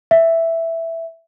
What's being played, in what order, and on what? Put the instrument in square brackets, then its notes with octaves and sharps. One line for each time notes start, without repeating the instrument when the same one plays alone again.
[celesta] E5